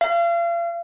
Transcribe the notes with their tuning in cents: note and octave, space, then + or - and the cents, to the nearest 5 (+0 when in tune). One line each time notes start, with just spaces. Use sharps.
F5 -40